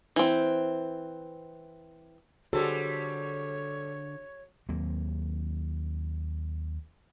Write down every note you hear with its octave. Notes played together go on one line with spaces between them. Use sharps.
E3 C4
D3 G3 F#4 G#4 A4 C5 C#5
D#2 F#3 A#3 C4